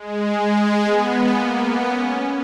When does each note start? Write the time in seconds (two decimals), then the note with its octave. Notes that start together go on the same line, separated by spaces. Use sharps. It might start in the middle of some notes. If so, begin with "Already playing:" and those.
Already playing: G#3
0.38 G#3
0.83 B3
1.28 A#3
1.57 B3
1.87 C#4